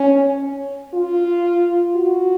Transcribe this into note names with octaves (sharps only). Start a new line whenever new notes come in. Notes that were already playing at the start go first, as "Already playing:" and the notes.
Already playing: C#4
F4
F#4